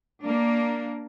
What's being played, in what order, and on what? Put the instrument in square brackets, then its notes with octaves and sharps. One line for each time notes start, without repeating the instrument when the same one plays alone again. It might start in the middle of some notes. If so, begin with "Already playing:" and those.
[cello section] A#3 D4